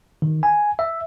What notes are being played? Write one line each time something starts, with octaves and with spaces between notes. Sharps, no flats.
D#3
G#5
E5